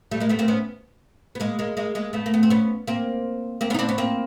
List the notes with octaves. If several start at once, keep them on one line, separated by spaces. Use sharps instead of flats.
G3 A3
G#3 A#3
A3 B3
A#3 C4
B3 C#4
B3
G#3 A#3
G#3 A#3
G#3 A#3
G#3 A#3
A3 B3
A#3
B3
C4
B3 C#4
A#3 C4
A#3 C4
B3 C#4
D#4
C4 D4
B3 C#4
A#3 C4